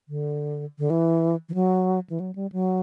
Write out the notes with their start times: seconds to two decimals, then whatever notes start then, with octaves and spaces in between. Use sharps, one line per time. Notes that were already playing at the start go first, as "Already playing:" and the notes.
0.09 D3
0.78 D3
0.90 E3
1.49 E3
1.54 F#3
2.10 E3
2.20 F#3
2.35 G3
2.52 F#3